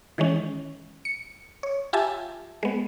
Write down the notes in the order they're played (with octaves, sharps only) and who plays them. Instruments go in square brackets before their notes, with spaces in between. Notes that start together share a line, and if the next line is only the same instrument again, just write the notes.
[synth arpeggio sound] D#3 E3 G#3 C#4
C#7
C#5
F4 G4 E5 G#5 A5
G#3 B3